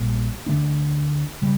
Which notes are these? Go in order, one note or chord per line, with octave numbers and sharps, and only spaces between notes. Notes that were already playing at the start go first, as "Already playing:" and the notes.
Already playing: A#1 A#2 G3
D2 D3 A3 D4
C#3 G3